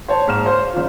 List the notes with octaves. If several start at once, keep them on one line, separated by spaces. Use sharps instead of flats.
C5 C#5 A5
G#2 F6 E7
C5 C#5
F#1 F4